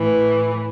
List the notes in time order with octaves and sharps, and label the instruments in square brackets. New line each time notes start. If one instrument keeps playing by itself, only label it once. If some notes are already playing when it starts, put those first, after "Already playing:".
Already playing: [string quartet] A2 E3